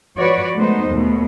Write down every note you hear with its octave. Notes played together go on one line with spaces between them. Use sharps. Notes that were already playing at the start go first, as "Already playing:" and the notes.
F3 F#4 B4 C#5 D5
G#3 A3 B3 D#4 C5
D#2 B2 A3